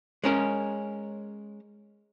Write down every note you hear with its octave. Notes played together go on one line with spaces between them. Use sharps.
G#3 C#4 A#4